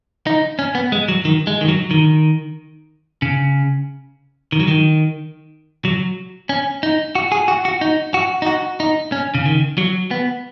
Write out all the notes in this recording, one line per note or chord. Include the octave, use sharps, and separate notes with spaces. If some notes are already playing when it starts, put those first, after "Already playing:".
D#4
C#4
B3
G#3
F#3
D#3
G#3
D#3
F#3
D#3
C#3
D#3
F#3
D#3
F#3
C#4
D#4
F#4
G#4
F#4
F#4
D#4
F#4
D#4
F#4
D#4
C#4
C#3
D#3
F#3
B3